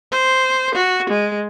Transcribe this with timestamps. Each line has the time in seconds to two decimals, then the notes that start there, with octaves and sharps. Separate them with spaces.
0.12 C5
0.75 F#4
1.10 G#3